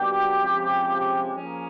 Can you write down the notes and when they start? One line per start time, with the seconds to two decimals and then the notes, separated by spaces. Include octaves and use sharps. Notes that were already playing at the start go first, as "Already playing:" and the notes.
Already playing: B2 F#3 A#3 D4 G4
0.38 C3 F3 G#3 C#4 F4
1.35 F3 A#3 C#4 G#4